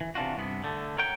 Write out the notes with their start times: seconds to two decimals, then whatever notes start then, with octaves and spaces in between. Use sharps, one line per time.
0.01 E3
0.15 C3 E3 D4 F4 F#4
0.37 G2 C3 B3
0.64 D3 A3
0.98 A#4 C#5 F#5 G5